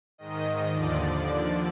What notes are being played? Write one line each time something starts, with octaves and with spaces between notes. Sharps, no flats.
G#2 D#3 D#5
D#2 D3 F3 D5
D#2 D3 F3